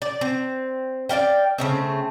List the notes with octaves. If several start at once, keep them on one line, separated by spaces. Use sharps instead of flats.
D5
C4
D5 D#5 F5 G5
C#3 A3 C4